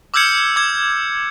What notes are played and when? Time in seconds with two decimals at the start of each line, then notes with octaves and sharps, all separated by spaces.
0.14 D6 E6 F6 G6 G#6 C#7
0.56 D6 G#6